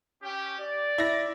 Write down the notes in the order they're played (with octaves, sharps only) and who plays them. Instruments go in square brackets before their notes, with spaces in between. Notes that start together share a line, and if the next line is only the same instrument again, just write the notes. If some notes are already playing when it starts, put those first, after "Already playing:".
[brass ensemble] C#4 G4
D5
[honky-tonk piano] E4 A#6